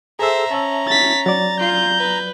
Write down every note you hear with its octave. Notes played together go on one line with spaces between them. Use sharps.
G#4 A4 C5 E5 A#5 E6
C#4 E5 A5
A6 B6
F#3 D5 A6
F4 G6
B4